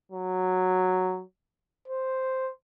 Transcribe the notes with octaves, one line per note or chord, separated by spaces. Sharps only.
F#3
C5